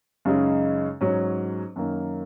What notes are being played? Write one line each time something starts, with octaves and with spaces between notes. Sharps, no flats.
F#2 C#3 G#3 D#4 G#4
G#2 F#3 C#4
F#2 D#3 A#3